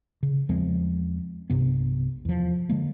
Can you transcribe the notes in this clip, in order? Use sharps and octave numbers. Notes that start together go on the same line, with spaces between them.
C#3
E2 F3 G#3 C4
B1 G2 C3 B3
E2 F3
D3 G#3 A#3